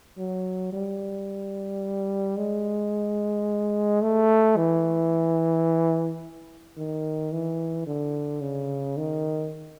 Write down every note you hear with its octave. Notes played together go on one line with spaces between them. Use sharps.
F#3
G3
G#3
A3
E3
D#3
E3
D3
C#3
D#3